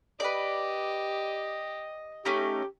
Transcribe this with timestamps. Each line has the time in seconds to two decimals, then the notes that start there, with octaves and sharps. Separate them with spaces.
0.20 G4 B4 D5 D#5
2.25 A3 C#4 D#4 G4